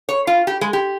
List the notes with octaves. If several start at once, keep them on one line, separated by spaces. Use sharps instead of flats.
C#5
F4
G4
G#3
G4